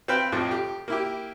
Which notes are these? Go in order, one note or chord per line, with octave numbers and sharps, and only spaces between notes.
C4 B4 C5 F5 G5 B5
F2 A2 C4 F4
G4
A#3 E4 G4